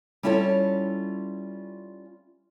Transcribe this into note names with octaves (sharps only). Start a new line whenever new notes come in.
G3 C#4 E4 F4 A4 C#5